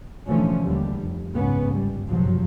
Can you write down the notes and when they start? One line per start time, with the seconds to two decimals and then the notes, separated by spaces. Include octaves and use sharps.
0.26 B2 D3 E3 F3 A3 C#4
0.63 D#2 D3 G3
0.98 F1
1.33 F#1 C#2 G#2 B3 C#4
1.75 G1 G3
2.08 F#1 C2 G2 A#2 F3 F#3